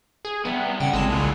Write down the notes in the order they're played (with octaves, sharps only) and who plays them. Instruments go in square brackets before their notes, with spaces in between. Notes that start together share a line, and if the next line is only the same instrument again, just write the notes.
[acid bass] G#4
[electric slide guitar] C3 G3 E5 [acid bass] B3
[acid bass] C#3 [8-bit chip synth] F#5 G5
[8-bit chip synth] G1 C4 A5 [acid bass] G#3
[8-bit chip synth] C2 C#3 [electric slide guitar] A#2 F#3